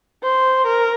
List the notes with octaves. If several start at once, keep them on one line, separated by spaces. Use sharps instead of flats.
C5
A#4